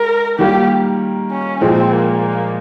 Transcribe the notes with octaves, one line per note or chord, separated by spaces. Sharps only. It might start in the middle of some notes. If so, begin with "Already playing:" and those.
Already playing: G#3 A#4
D#3 G3 A#3 F4 G4
C#4
A#2 F3 G#3 C4
A#3